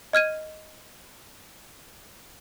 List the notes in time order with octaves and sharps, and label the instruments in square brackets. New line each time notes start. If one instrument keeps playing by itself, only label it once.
[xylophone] D#5 F6 G#6 D#7